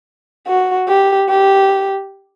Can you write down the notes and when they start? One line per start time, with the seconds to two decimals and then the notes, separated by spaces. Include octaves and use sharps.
0.47 F#4
0.88 G4
1.29 G4